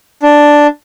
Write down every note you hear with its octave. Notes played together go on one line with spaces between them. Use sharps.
D4